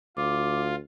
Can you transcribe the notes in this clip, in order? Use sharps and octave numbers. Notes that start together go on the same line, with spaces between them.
D2 F4 D6